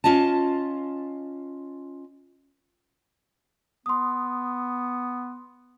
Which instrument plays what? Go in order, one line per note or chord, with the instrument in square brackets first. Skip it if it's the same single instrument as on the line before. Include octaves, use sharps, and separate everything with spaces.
[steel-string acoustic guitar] C#4 F4 D#5 A5
[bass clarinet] B3 [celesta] C6 D#6